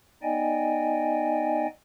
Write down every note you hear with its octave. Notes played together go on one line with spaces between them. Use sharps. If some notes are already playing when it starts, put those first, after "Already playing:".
B3 D#4 D5 D#5 G5 G#5